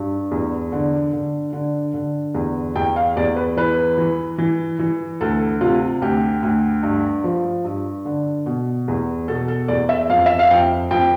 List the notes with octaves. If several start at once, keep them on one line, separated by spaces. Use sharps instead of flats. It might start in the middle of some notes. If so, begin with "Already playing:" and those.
Already playing: G2
E2
D3
D3
D3
D3
E2
E2 G5
F5
E2 D5
B4
E3 B4
E3
E3
E3
D2 A4
C3 F4
D2 G4
D2
G2
F3
G2
D3
B2
E2
B2 A4
A4
E2 D5
E5
F2 F5
E5
F5
F2 G5
F2 G5